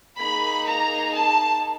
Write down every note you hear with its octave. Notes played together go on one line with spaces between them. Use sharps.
A#3 D#4 G#4 B5
A#5
A5